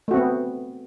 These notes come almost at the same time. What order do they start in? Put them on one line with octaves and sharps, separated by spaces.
A3 F#4 C4 B3